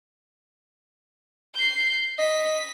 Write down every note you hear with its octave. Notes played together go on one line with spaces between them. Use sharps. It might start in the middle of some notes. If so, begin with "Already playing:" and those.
G6 C7
D#5 B6